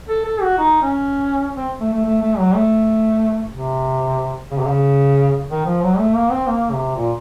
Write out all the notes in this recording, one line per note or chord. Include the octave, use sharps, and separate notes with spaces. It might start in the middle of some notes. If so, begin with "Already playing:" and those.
A4
A4
F#4
D#4
C#4
C4
A3
A3
A3
A3
F#3
A3
C3
C#3
C3
C#3
D#3
F3
F#3
A3
A#3
C4
A#3
C3
A#2